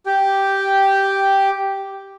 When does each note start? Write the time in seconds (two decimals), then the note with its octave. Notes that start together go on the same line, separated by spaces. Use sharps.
0.06 G4 G5